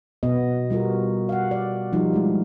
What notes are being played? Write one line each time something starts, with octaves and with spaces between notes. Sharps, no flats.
B2 B3 D#5
G3 F4 F#4 A#4
F5 F#5
D5
F3 G3 D#4 F4
G#3 A3 E4